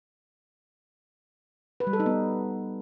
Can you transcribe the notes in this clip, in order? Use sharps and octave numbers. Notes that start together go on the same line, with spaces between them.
B4
G3
A4
D#4
B3